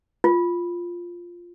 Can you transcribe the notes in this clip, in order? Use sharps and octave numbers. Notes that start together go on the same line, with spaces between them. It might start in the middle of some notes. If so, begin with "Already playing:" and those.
F4